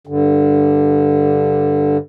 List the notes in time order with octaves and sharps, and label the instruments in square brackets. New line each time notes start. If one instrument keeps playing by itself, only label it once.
[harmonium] G2 D3